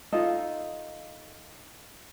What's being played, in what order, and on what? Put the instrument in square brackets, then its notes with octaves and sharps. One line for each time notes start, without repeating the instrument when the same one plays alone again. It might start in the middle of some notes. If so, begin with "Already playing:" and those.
[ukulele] D#4 F4 A4 D#5